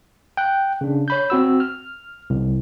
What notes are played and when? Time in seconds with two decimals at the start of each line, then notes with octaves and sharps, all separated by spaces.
0.37 G5 F#6
0.81 C#3 D4
1.08 C#5 B5 G6
1.30 C4 F#4 E6
1.60 F6
2.30 C2